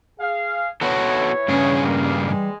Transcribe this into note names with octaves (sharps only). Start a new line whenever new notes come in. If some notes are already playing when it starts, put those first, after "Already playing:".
G#4 F5
E3 B3 F#4 A4 C#5
G2 C#3 C#4 G#4 F#5
G3 A#3
E3 G3 G#3